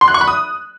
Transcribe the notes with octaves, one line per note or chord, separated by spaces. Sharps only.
C6
F#6
C#6
B5
D#6